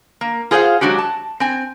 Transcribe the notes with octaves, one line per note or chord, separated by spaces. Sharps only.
A#3
F4 G#4 C5 D#5 F5 F#5
F#3 G#3 D4 F#4 G4
A5
C4 G#5